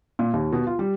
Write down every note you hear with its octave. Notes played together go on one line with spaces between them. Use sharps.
A#2
D#2
B2
F4
G3